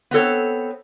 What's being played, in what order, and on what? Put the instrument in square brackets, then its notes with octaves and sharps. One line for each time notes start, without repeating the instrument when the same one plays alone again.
[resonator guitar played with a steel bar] B3 C4 A4 C#5